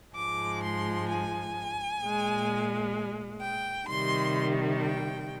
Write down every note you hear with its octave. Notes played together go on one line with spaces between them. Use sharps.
G#2 F3 G#3 D6
C6
G#5
A#2 G#3
G5
C3 D#3 G3 C6
G5